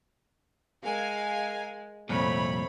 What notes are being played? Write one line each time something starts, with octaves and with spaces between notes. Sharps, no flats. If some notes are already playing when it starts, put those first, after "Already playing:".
G#3 A#4 F5 G#5
C2 F2 A#2 A3 C4 C#5 B5